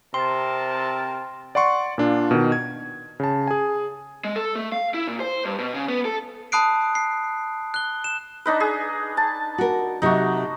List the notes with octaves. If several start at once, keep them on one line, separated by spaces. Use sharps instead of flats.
C3 C4 A#4 A5 C6
D5 F#5 C6 C#6
A#2 D4 F4
B2 D#3
G#6
C#3 A5
G#4 G#5
G#3
A4
A3
F5
E4
A#2
C5
G2
B2
C#3
B3
A4
A5 B5 D#6 F#6 C7 D7
C7
F#6 G7
E7
D4 D#4 B4
G#4
A5
F#4 A#4
C3 F#3 A3 D#4 F#4